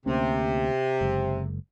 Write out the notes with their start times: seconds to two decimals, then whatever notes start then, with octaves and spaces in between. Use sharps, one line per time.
0.06 D2 C3 A#3 C#4
1.01 F#1 G#3